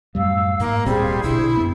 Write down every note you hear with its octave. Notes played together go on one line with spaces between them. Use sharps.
F#2 A2 G3 F5 E6
G#2 A#3
D1 A#2 G3 C4 G#4 C5
A#1 B2 D3 E4
F#2 B3